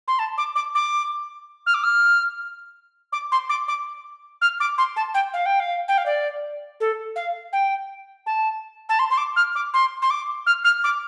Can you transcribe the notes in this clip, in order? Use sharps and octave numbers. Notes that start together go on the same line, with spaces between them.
C6
A5
D6
D6
D6
F6
D6
F6
D6
C6
D6
D6
F6
D6
C6
A5
G5
F5
G5
F5
G5
F5
D5
A4
F5
G5
A5
A5
C6
C6
D6
F6
D6
C6
C6
D6
F6
F6
D6